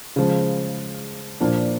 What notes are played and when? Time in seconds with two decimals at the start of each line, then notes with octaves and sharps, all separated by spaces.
0.16 C#3 F3 G#3
1.40 A#2 F3 A#3 D4